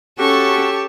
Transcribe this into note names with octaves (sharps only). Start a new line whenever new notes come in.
C#4 F#4 G4 A4 A5 C#6